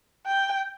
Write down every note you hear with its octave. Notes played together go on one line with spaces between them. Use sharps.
G5